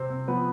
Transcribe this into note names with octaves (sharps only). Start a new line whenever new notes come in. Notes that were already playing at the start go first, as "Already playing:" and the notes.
Already playing: C3 C4 C5
C3
F3 B3 B4